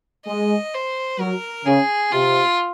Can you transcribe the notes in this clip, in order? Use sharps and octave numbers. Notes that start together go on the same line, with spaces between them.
G#3 D#5
C5
F#3 A#4
C#3 G#4
C3 F4